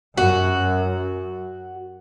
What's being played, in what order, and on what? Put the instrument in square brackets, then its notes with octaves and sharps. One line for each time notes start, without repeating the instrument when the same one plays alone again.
[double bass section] F#2 [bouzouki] F#4